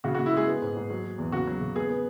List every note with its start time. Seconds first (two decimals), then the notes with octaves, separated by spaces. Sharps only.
0.04 C#3 F#4
0.15 F#4
0.19 C#3
0.26 E4
0.33 G#3 G#4
0.47 B3
0.62 G#2
0.76 G#2
0.90 F#3
1.04 F#3
1.18 E2
1.32 C#3 F#4
1.47 F#3
1.61 C#3
1.75 B3 G#4
1.89 B3